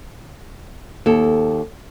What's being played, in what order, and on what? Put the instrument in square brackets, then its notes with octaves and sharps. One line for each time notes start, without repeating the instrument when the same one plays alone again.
[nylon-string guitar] D#2 A4